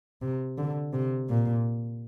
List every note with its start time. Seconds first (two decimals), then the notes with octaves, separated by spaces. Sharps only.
0.22 C3
0.58 D3
0.94 C3
1.29 A#2